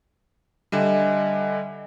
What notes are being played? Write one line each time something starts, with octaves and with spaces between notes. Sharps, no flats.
D3 G3 D#5 E5 G#5